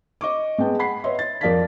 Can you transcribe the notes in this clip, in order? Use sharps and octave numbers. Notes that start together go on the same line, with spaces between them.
D#5 C#6 D6
G#3 B3 G5 A5
F#5 B5 C7
B4 C#5 D#5 E5 C6
A6
F2 A#4 D5 F5 A5 B6